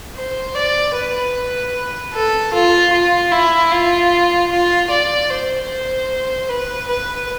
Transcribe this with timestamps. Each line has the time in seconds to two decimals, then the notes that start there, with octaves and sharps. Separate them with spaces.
0.16 C5
0.55 D5
0.94 B4
2.13 A4
2.53 F4
2.93 F4
3.32 E4
3.72 F4
4.51 F4
4.90 D5
5.30 C5
5.70 C5
6.49 B4
6.88 B4